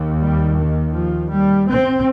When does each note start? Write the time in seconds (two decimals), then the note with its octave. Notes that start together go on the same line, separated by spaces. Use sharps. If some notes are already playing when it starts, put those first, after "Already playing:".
Already playing: D#2
0.21 G3
0.58 D#3
0.95 F3
1.31 G3
1.69 C4